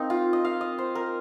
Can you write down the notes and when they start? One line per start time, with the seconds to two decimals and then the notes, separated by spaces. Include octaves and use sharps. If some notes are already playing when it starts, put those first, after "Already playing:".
Already playing: A#3 C4 D#4
0.10 F4
0.33 D#5
0.44 F5
0.61 D#5
0.78 C5
0.95 A#4